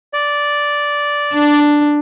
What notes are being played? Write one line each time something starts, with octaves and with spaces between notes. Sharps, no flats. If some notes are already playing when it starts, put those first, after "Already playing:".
D5
D4